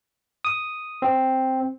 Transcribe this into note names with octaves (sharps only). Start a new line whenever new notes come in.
D#6
C4